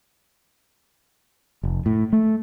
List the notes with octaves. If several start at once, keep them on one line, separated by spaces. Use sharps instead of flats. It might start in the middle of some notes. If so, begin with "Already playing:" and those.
F1
A2
A3